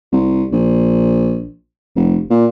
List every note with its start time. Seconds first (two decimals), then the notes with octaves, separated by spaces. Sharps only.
0.12 C2
0.52 A#1
1.96 F1
2.30 A#2